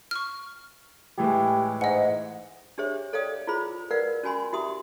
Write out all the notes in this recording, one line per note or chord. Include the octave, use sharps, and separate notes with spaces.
C#6 F6
A2 E3 G#3 G4
G#2 D#5 F#5
D4 G4 G#4 C5 C#5 E5
A4 C#5 D5 F5 G5 D#6
E4 F4 G#4 C5 B5
A#4 B4 D5 F5 F#5
C#4 F#4 G#5 B5 C6
E4 F#4 G4 E5 C6 D#6